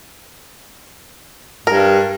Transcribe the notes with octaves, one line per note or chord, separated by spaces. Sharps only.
G2 A#4